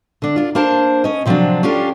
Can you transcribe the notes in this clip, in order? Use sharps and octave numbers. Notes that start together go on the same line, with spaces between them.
D3 D4
D4 F4
A#3 D4 A#4 C5 A5
C#4 D#5
C3 F3 F#3 B3 C4 D4
C#4 D4 F4 G4 A4